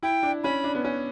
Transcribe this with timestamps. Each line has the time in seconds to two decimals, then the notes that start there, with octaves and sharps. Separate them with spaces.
0.03 E4 G5
0.23 D4
0.44 C#4 B5
0.64 D4
0.75 B3
0.85 C#4